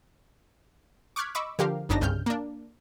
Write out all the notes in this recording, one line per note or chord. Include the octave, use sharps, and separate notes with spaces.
C#6 D6 F6 F#6 G#6 B6
D#5 B5 C#6 D6 E6
D3 F3 G4 A#4 F5
G1 F#2 D4 D#4 A5 A#6
C2 G2 C#3 F6 G6
A#3 D4